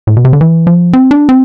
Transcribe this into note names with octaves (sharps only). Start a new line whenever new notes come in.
A2
B2
C3
D3
E3
F3
C4
D4
C4